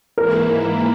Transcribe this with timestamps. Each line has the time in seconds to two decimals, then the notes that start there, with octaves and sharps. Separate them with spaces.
0.17 G#2 E3 A#3 E4 A#4